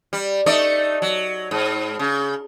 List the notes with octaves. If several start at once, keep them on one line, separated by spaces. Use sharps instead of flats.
G3
A3 D#4 D5
F#3
G#2
C#3